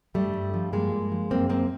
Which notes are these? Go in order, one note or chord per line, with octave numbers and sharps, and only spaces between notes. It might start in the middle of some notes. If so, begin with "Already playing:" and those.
G2 G3 A3
G2
F3
G2 G#3 A#3
G2
F3
F#2 A#3 C4
F#2 A#3 C4